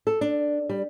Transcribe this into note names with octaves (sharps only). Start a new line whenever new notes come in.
A4
D4
G3